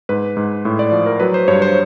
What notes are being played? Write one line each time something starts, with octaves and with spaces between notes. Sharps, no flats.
G#2 B4
G#2
A2
D5
F3
A#4
F#3 B4
C5
G2 C#5
C5